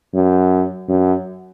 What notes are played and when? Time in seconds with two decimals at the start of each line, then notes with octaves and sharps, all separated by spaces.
0.14 F#2
0.89 F#2